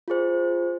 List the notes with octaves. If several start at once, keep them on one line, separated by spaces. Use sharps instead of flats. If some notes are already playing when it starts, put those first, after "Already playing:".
F4 G#4 C5